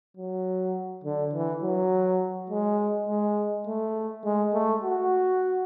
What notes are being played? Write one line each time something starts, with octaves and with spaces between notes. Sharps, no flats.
F#3
D3
E3
F#3
G#3
G#3
A3
G#3
A3
F#4